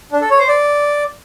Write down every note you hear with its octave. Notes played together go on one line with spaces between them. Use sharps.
D4
A4
C#5
C5
D5